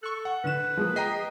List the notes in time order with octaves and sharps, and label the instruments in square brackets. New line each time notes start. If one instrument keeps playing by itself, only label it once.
[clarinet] A4 [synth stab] C#6 F#6
[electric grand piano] F#5
[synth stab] A2 D3 E7 [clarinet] B4
[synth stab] F3 G#3 A#3 [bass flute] G#4
[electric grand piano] D#5 G5 A#5 [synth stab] D#6 B6 C7